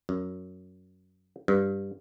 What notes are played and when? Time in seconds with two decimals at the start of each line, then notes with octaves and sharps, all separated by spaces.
0.09 F#2
1.48 G2